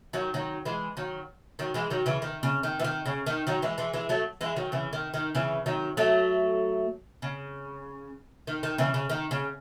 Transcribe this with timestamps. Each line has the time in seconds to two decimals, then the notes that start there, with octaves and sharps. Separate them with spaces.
0.13 D#3 F#3
0.34 D#3 F#3
0.65 E3 G#3
0.97 D#3 F#3
1.59 D#3 F#3
1.74 E3 G#3
1.90 D#3 F#3
2.06 C#3 E3
2.22 D#3
2.43 C#3
2.63 D#3
2.80 E3
2.84 D#3
3.06 C#3
3.26 D#3
3.47 D#3 F#3
3.62 E3 G#3
3.78 E3 G#3
3.93 E3 G#3
4.09 F#3 A3
4.41 E3 G#3
4.56 D#3 F#3
4.72 C#3 E3
4.93 D#3
5.14 D#3
5.35 C#3 E3
5.66 D#3 F#3
5.97 F#3 A3
7.22 C#3
8.47 D#3
8.63 D#3
8.78 C#3 E3
8.94 C#3
9.10 D#3
9.31 C#3